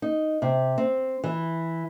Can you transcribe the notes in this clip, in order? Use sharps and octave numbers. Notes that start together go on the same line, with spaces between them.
D#4
C3
C4
E3